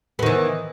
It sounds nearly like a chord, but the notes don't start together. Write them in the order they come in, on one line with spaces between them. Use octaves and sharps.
B3 D#3 E3